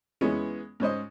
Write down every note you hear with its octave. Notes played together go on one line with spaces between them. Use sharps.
E3 G#3 B3 C#4
G#2 C#4 C5 D#5